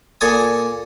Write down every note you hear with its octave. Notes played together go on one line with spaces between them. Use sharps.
A#2 A4 G#5 D#6